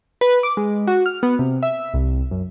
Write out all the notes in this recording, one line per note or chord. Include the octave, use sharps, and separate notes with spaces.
B4
D6
G#3
F#4
F6
B3
C3
E5
C2
F#2